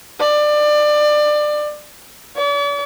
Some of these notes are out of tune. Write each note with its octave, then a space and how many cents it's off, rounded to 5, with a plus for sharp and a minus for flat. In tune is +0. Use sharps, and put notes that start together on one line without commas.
D5 +25
D5 -45